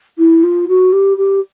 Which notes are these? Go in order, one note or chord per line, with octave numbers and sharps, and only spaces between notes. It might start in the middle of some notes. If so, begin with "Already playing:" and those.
E4
F4
F#4
G4
G4